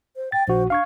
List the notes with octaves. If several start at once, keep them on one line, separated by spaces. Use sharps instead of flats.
C5
G5 A6
A#1 F#4 C5
D4 F5 C#6 G#6